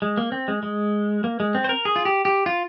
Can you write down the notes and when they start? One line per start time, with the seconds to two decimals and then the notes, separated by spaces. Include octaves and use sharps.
0.02 G#3
0.17 A#3
0.32 C4
0.48 G#3
0.63 G#3
1.24 A#3
1.40 G#3
1.55 C4
1.64 C5
1.69 A#4
1.85 G#4
1.96 F4
2.05 G4
2.25 G4
2.46 F4